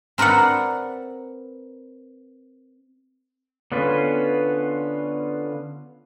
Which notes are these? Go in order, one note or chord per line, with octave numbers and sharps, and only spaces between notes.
C4 A#4 B4 D5 F#5
D3 B3 C#4 F4 B4